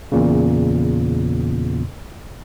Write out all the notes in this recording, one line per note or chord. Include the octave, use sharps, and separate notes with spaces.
E2 A#2 C#3